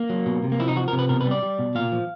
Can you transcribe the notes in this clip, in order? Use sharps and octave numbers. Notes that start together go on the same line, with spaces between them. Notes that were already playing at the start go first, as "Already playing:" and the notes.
Already playing: A#3
F#3
B2
C3
A#3
F3 E4
D#4
F3 F#4
C3 A#4
B4
B2 A#4
B4
G3
D5
G3
B2
A#2 F5
F3